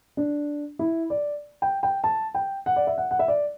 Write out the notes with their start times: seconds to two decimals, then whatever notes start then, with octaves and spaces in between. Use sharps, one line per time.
0.17 D4
0.79 E4
1.10 D5
1.62 G5
1.83 G5
2.04 A5
2.34 G5
2.66 F#5
2.76 D5
2.87 E5
2.98 F#5
3.11 F#5
3.19 E5
3.28 D5